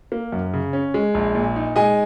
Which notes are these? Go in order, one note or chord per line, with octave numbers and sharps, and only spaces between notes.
A#3
F#2
C#3
C#4
G#3
A#1
A#2
D#4
G#3 D#5 G#5